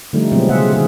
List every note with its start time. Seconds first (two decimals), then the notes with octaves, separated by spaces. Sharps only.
0.13 D3 F3 G3 A3 D#4
0.32 B2 F3 F#3 G#3 B3 C4
0.49 C#3 F4 G#4 E5 F#5
0.73 D#3 G#4